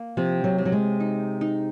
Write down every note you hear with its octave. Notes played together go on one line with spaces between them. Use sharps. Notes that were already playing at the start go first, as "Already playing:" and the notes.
Already playing: A#3
C3 F3
F#3
C3
F#3
G#3
D#4
D#4